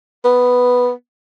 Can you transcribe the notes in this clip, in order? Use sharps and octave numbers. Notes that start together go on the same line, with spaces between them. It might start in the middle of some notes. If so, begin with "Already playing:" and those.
B3